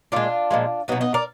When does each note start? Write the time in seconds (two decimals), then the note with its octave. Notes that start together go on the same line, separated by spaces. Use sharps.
0.12 A#2 G#3 D4 F4
0.51 A#2 F3 G#3
0.88 B2 F#3 B3 D#4
1.01 B3 D#4
1.14 A#4 D5